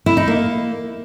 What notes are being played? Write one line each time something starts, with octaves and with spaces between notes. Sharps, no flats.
E4
D#4
A#3